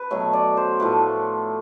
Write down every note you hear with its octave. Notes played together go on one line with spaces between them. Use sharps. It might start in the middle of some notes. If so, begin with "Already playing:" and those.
Already playing: B4
B2 F#3 A3 C#5
D5
C5
A2 F3 A3 B4